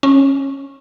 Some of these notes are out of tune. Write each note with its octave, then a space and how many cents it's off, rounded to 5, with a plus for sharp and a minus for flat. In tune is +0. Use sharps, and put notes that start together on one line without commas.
C#4 -20